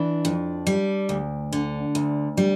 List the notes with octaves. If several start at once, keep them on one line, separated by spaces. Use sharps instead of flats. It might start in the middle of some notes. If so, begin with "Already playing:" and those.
Already playing: E3 D4
F2
G3
D2
D3
D2
G3